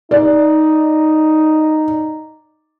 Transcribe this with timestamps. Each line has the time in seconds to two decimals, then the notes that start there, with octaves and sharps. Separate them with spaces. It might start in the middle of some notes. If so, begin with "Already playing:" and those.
0.11 D#4 D5